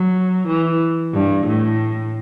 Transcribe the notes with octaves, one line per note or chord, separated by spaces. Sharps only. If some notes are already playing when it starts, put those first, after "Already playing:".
Already playing: F#3
E3
G2
A2